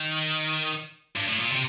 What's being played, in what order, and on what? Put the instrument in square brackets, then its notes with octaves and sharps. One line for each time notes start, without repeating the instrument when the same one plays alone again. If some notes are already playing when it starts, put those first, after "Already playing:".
Already playing: [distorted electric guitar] D#3
G2
A2
A#2
C3